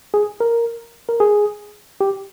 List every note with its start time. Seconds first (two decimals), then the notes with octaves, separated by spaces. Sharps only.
0.14 G#4
0.40 A#4
1.09 A#4
1.20 G#4
2.01 G4